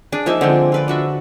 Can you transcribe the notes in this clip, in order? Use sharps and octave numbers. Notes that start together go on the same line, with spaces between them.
D4 G#4
F3 A#3 D#4 E5
D3 G#3 C4
F4 B4 D5
D4 F#4 E5